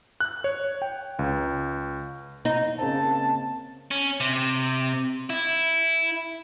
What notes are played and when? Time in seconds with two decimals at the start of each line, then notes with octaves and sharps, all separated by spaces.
0.20 F#6
0.44 C#5
0.82 G5
1.19 C#2
2.45 D#4
2.79 C#3 A#3 C4 A5
3.91 C#4
4.20 C3
5.30 E4